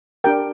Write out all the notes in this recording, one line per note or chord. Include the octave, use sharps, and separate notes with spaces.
D4 G4 A#4 G5